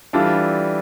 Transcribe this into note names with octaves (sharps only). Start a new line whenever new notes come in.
E3 G3 D4 F4 A4